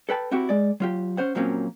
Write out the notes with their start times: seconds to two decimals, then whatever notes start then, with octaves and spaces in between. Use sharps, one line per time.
0.09 A4 B4 G5 A5
0.31 C4 E4 F#4 G4
0.49 G#3 D5
0.80 F#3 F4 G4
1.17 C#4 C5 F#5
1.35 A#2 F3 F#3 A#3 C4 C#4